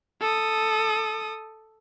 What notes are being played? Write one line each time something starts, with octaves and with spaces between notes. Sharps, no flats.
A4 D#6